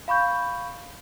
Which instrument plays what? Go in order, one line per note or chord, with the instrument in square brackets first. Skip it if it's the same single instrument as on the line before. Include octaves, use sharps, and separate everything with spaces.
[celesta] F5 B5 C#6 G6